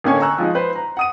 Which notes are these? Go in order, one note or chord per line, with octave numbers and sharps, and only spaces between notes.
A1 D3 A#3 C#4 G#5 C#6
G#5 A#5 C#6 E6 F#6
F3 G#3 D#4
B4 C5
A#5
F#5 D#6 D#7